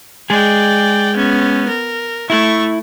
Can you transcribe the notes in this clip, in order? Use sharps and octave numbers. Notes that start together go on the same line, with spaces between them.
G#3 G#4 D5 G5
B3 C#4
A#4
A3 E4 C#6